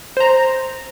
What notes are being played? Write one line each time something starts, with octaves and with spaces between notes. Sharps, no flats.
C5 A#5